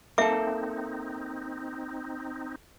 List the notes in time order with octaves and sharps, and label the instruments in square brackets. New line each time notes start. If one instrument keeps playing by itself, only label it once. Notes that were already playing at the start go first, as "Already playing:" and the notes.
[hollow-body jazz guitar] A#3 A4 [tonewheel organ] C4 D#4 [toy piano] E5 D6